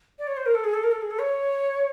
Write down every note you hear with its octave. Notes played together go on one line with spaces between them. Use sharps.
D5
C#5
C5
A#4
A4
G#4
A4
A#4
A4
G#4
A4
C#5